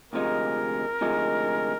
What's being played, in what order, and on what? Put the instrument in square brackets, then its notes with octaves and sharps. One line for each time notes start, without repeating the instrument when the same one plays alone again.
[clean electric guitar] D2 C3 F3 G#3 D#4 [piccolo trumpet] A#4
[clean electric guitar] D2 C3 F3 G#3 D#4